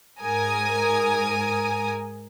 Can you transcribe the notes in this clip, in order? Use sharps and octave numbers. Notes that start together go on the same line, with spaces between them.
G#2 A#4 G#5 D#6